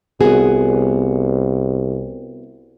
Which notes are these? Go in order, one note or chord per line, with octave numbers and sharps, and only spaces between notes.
C2 B3 F#4 G#4